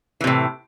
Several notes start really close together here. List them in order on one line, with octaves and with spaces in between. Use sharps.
E3 C3 A2